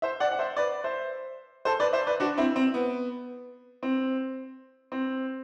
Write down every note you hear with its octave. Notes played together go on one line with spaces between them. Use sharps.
C5 E5
D5 F#5
F#5
C5 E5
B4 D5
C5 E5
A4 C5
B4 D5
C5 E5
B4 D5
D4 F#4
C4 E4
C4
B3
C4
C4